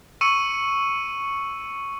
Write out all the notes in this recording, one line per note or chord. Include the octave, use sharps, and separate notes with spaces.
C#6 E6 C#7 D#7